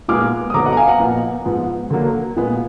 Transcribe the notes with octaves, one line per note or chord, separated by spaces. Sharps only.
A#2 G#3 B3 D#4 D6 F6
D#6
D3 F#3 B3 A#5 D6
D#5 F#5
A#5
F5 G#5
F#5 A#5
A#2 F3 B3
G#2 F3 B3
D3 F#3 A#3
A#2 G#3 B3